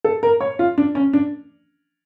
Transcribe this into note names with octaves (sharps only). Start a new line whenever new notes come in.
A4
A#4
C#5
F4
D4
C#4
D4